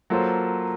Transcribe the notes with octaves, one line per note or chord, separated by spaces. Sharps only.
F#3 A#3 F4 A4 C5